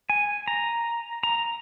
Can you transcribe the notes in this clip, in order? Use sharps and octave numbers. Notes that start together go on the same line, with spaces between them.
G#5
A#5
A#5